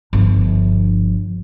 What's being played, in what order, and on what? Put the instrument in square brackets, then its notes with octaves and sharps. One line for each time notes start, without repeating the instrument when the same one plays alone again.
[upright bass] G1 F3